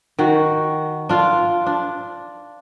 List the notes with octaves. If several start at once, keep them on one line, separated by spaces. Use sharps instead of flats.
D#3 F#4
D4 F4
D4